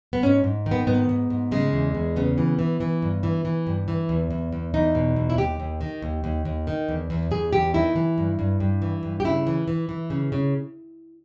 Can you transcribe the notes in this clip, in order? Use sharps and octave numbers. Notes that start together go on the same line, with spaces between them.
B3
G#2 C#4
G#2
D#3
B3
G#2 B3
G#2
G#2
C#3 G#3
E2
E2
C#3 B3
E3
E3
E3
G2
E3
E3
G2
E3
E2
E2
E2
E2 D#4
B2
E2
E4
D#2 G4
D#2
D#3
D#2
D#2
D#2
D#3
E2
E2
E2 G#4
E2 G4
D#3 E4
E3
G2
G2
G2
E3
G2
G4
C#3 E4
E3
E3
E3
C#3
C#3